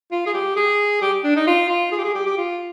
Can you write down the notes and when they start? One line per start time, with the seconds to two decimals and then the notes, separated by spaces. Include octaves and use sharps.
0.11 F4
0.26 G#4
0.34 G4
0.56 G#4
1.02 G4
1.24 D4
1.36 D#4
1.47 F4
1.69 F4
1.92 G#4
1.98 G4
2.04 G#4
2.15 G4
2.26 G4
2.38 F4